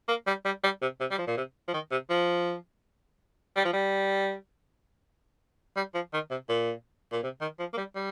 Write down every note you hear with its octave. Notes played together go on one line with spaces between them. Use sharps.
A#3
G3
G3
G3
C3
C3
G3
F3
A#2
C3
F3
D#3
C3
F3
G3
F3
G3
G3
F3
D#3
C3
A#2
A#2
C3
D#3
F3
A#3
G3
G3